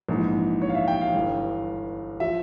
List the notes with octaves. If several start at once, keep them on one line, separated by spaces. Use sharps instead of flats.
A#1 G#2 E3
C#5
F5
E5
G5
F5
G1 G2 E3
F3 E5